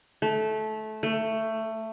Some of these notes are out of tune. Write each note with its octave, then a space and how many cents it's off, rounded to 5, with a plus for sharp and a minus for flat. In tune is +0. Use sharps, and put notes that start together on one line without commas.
A3 -20
A3 +15